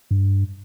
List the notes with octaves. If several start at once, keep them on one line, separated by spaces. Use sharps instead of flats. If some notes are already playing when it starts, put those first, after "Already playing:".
G2